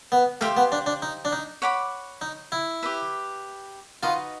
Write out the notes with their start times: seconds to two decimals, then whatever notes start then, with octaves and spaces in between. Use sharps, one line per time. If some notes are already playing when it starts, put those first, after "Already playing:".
0.12 B3
0.41 A3 G4 C5 F5
0.57 B3
0.72 D4
0.86 D4
1.02 D#4
1.25 D4
1.32 D#4
1.62 C#5 F#5 B5 D6
2.21 D#4
2.52 E4
2.83 G4 B4 E5
4.03 D#4 F4 F#4 B4 D#5